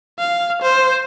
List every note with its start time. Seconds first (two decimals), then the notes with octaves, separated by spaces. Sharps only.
0.19 F5
0.62 C5